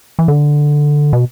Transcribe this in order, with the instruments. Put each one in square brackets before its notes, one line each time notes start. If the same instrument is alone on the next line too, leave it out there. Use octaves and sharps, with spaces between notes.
[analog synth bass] E3
D3
B2